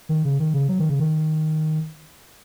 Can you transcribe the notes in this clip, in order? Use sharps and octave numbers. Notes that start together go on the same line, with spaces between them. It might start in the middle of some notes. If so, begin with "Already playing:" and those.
D#3
C#3
D#3
C#3
F#3
D#3
C#3
D#3